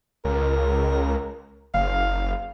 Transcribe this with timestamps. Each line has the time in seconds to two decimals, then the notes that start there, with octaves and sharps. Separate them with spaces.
0.25 C#2 A#4
1.74 F#1 F5